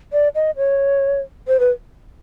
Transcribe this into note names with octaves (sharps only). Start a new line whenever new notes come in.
D5
D#5
C#5
C5
B4